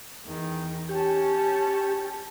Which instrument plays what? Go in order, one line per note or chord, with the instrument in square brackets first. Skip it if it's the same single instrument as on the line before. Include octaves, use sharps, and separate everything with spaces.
[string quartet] E2 D#3
[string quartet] C#4 C#5 A5 [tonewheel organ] G4